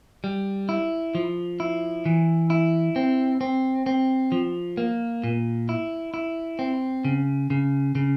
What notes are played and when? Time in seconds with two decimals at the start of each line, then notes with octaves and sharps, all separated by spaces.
0.24 G3
0.69 E4
1.15 F3
1.60 E4
2.06 E3
2.50 E4
2.96 C4
3.41 C4
3.86 C4
4.32 F3
4.77 A#3
5.24 A#2
5.69 E4
6.14 E4
6.59 C4
7.05 C#3
7.50 C#3
7.95 C#3